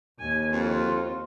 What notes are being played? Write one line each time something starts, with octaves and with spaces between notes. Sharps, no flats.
D#2 G#5
F2 C4 F4 F#4